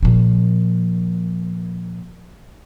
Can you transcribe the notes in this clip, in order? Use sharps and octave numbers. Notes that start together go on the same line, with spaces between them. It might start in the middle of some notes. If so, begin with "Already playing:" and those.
A#2 F3